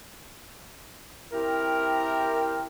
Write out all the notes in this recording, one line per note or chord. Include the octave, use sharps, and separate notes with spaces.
C4 E4 G4 A#4